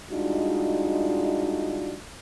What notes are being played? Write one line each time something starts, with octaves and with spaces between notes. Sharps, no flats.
G3 G#3 D4 D#4 F4 F#4